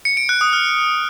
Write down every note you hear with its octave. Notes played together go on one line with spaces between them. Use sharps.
C#7
D7
F#6
D#6
F6